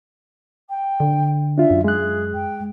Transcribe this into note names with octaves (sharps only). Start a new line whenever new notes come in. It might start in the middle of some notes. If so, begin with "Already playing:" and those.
G5
D3
D4 F4 E5
F#2
G#3 G#4 F#6
G5